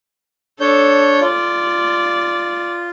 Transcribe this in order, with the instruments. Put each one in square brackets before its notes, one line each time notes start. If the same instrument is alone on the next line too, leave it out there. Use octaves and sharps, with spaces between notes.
[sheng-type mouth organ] D4 C#5 G6 [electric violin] A4
[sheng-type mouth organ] F4 [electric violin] D5